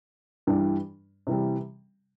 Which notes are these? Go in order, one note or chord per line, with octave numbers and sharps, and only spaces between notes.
G2 E3 G3 D4
C3 E3 G3